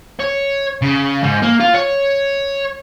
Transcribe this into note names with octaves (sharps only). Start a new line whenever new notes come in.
C#5
C#3
G#2
A#3
F4
C#5